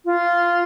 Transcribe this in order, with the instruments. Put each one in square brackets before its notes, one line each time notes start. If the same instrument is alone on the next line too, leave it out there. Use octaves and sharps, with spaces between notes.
[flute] F4